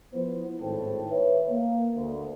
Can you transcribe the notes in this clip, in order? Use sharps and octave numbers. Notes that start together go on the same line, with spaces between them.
F3 B3 E4 C5
G#1 A2 A4 C5 G5 A5
B4 C#5 E5
A#3
D2